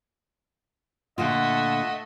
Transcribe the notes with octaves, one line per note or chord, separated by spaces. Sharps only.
A#2 D3 A3 F4 D#5 F#5